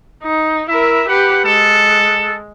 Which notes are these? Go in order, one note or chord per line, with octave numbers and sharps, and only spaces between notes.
D#4
E4 A#4 E5
G4 B4 F#5
G#3 A4